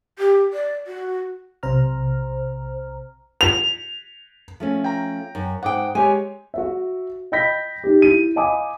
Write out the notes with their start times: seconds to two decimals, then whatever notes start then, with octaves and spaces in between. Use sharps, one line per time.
0.19 G4
0.53 D5
0.87 F#4
1.63 B1 C3 C5 A#5 F6
3.41 F7
4.60 F3 A3 C#4
4.84 G5 A#5
5.35 F#2
5.63 G#2 F#5 G5 D6 D#6
5.95 G#3 G4 C#5 G#5
6.54 F#4 E5
7.32 D#5 G5 B5 G6 A#6 B6
7.84 D#4 G4
8.02 E4 D#7
8.36 D#5 F5 G#5 B5 D6 D#6